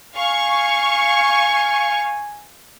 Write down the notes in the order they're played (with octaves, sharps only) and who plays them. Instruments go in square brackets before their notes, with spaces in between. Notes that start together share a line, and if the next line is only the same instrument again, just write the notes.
[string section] F5 C#6 [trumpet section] G#5